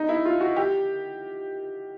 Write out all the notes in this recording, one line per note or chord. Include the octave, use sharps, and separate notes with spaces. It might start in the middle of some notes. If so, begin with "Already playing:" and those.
Already playing: D#4
E4
F4
F#4
G4